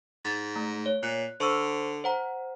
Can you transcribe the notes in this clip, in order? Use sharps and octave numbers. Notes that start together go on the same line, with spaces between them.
G#2 A6
A3
C#5
A#2 F#6
D3 C5 C#6 E6
C5 F#5 A#5